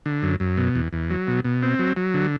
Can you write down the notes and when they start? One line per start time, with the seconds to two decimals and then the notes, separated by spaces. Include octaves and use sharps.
0.06 D3
0.23 F#2
0.40 F#2
0.57 B2
0.75 E2
0.93 E2
1.10 F#3
1.27 B2
1.44 B2
1.63 C4
1.79 F#3
1.96 F#3
2.14 D3